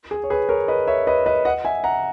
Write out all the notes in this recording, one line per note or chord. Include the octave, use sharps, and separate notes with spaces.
G#4
C#5
G#4 B4
A#4 C#5
B4 D#5
C#5 E5
B4 D#5
B4 D#5
D#5 F#5
E5 G#5
F#5 A#5